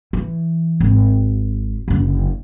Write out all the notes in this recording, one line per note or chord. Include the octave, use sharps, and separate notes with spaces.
E3
G#1
F#1 D3